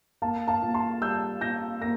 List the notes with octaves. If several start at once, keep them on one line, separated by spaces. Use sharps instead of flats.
A#3 F5 A5
F5 A5
A#2
A5 C6
G3 E6 G6
A#2 G6 A#6
A#3 A#6